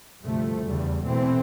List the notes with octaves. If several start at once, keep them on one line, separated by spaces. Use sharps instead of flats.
D2 G2 C3 F3 A3
E2 C#3 G3
B2 E3 A3 C4